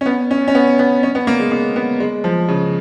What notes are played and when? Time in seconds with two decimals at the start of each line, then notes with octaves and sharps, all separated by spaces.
0.01 C#4
0.06 B3
0.31 C#4
0.48 C#4
0.55 B3
0.79 B3
1.03 C#4
1.15 B3
1.27 A#3
1.39 G#3
1.52 A#3
1.76 B3
2.00 G#3
2.24 F3
2.48 C#3